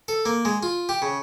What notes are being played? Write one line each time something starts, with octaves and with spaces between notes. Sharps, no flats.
A4
A#3
G#3
F4
G4
C#3